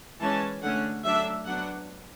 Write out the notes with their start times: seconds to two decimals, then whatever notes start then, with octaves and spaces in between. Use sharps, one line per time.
0.20 E3 G#3 C#4 A5
0.62 D3 A3 C#4 F#5
1.04 F#3 A3 D4 E5
1.46 F#3 B3 D4 F#5